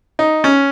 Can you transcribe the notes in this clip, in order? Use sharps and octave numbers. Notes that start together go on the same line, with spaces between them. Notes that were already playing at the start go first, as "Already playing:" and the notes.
D#4
C#4